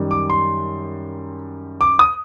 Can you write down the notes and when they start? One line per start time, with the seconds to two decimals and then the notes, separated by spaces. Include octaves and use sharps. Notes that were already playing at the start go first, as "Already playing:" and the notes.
Already playing: F#2 D#3 G3
0.11 D6
0.30 C6
1.81 D6
1.99 D#6